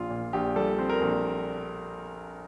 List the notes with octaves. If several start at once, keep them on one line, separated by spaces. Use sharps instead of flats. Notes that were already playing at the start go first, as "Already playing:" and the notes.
Already playing: A#1 F4
A#2
A#1 G4
G3 A4
C4
A#4
A#1